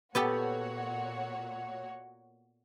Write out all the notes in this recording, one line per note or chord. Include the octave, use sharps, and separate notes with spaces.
A#2 B3 F#4 G4 A4 C#5